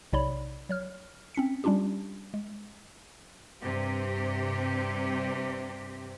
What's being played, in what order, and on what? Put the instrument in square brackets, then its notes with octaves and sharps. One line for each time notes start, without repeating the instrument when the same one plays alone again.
[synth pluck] B1 C3 D#4 C#5 D5 B5
F#3 C#5 F6
C4 C#4 B6 C#7
G3 C#4 D4 F4 G4
G#3
[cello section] G2 C3 G4